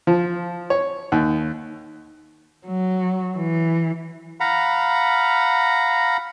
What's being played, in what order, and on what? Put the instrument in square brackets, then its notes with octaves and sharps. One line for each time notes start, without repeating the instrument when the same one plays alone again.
[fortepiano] F3
C#5
D#2
[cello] F#3
E3
[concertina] F5 F#5 A#5 B5